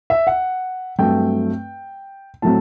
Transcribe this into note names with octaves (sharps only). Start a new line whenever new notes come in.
E5
F#5
G2 F#3 A3 C4 G5
A2 F#3 A3 C4 A5